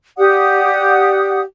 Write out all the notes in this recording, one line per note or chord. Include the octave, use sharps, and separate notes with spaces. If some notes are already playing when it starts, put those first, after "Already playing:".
G4 D5 F#5 D#6